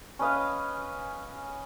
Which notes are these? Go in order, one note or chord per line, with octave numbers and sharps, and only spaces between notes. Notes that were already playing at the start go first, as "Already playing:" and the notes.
C#4 B4 D#5 F5